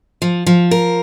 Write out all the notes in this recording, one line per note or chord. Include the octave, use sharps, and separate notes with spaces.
F3
F3
A#4